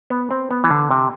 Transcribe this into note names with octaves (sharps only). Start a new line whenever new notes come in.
B3
C4
B3
E3
D3
C3